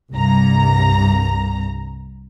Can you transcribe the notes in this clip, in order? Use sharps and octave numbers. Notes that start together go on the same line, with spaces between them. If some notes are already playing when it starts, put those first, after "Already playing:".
C2 G2 A#5